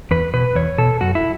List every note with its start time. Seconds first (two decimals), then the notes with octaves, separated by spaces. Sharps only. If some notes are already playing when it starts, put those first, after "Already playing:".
0.11 E2 B4
0.34 B2 B4
0.55 E2 C#5
0.78 B2 A4
1.01 F#2 F#4
1.15 E4